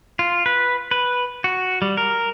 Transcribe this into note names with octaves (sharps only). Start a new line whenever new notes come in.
F4
B4
B4
F#4
G3
A#4